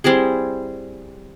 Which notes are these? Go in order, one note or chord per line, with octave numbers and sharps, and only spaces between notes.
G3 C4 E4 G#4